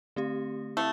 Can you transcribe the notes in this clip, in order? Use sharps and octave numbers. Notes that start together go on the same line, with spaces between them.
D3 A3 C4 G4
A3 C4 E4